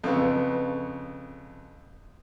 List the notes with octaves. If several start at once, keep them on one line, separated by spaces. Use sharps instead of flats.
F2 C#3 B3